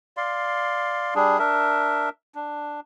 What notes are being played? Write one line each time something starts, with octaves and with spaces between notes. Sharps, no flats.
D5 F5 C6
G3 D4 G#4
D4 A#4 E5
D4